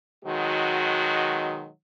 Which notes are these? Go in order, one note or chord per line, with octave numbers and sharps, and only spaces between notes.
B2 D#3 F#3 G#3 F#4